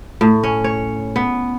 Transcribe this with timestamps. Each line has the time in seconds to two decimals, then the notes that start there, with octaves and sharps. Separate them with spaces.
0.21 A2
0.43 C#4
0.64 C#5
1.16 B3